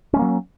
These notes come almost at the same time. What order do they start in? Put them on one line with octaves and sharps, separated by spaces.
C#4 G#3 A#3 F#3